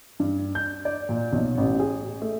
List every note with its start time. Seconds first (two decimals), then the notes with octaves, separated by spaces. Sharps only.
0.20 G2
0.55 G6
0.85 D5
1.09 A#2
1.33 B1
1.58 A1
1.79 G#4
2.22 A3